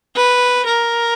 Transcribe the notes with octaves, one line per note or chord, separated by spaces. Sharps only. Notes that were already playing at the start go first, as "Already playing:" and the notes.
B4
A#4